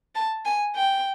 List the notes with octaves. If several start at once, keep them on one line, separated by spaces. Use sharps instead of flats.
A5
G#5
G5